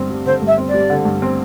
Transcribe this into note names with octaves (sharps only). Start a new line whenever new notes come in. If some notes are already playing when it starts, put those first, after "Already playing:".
Already playing: G2 D3 C4
G3
D3 C5
G2
E5
C4
D5
G3
D3
G2
C4